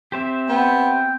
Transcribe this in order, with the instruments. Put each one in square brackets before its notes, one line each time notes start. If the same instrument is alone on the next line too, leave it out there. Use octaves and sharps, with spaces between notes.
[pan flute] C4 [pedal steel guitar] G4 C5 E5
[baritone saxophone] B3 [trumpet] G5